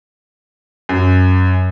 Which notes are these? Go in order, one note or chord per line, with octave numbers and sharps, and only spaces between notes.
F#2